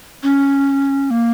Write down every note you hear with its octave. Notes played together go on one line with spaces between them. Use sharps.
C#4
A#3